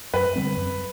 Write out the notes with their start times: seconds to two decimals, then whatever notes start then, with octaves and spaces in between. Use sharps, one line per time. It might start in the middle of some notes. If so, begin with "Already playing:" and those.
0.13 F#2 B4
0.36 D3 G3 C4
0.57 F#2